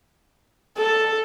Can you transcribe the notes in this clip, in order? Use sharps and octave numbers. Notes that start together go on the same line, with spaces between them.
A4